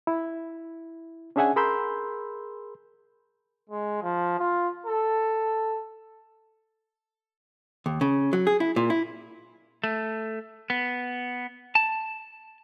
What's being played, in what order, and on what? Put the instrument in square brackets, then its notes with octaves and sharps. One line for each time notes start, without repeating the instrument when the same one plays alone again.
[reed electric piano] E4
C#4 D4 G#4 E5 F#5 G#5
G#4 A#4 B5 C6 E6 G6
[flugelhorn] G#3
F3
F4
A4
[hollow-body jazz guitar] D#2
C#3
F#3
G#4
E4
A#2
E4
[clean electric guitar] A3
B3
A5